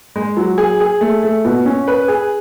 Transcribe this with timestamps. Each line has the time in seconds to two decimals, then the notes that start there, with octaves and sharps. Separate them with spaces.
0.16 G#3
0.37 F#3
0.58 G#4
0.80 G#4
1.01 A3
1.23 A3
1.45 B2
1.66 C#4
1.88 B4
2.08 G#4